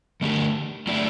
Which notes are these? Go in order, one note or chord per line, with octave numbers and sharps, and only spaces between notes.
D3 A3 D4 G4
D3 A3 E4 G4 D5